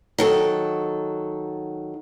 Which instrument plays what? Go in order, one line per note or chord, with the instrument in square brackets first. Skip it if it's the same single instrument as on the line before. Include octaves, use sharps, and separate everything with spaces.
[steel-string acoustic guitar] D#3 F#3 A4